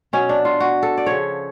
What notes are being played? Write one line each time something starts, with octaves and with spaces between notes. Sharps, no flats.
B2 F#3 C#4
D4
F4
F#4
A4
D5
C#3 F3 C#5